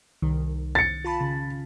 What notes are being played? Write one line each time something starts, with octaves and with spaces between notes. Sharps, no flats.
C2 D#3
C2
A6 C#7
F4 A5 B5
C#3